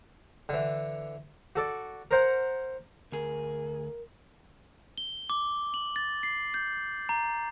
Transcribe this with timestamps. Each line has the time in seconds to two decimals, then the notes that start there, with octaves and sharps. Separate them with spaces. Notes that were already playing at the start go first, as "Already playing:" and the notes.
0.49 D3 E3
1.56 F#4 A4 D5
2.11 A#4 C5 F#5
3.12 D2 G#4 A#4
4.98 G7
5.30 D6
5.74 F#7
5.96 A6
6.23 C7
6.54 G6
7.09 A#5